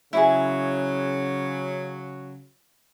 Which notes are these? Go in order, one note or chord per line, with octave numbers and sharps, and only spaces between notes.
C#3 F#3 E4 G#4